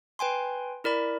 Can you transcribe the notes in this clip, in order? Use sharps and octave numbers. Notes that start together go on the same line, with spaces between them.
B4 G5 G#5 C6
E4 A#4 D5 B5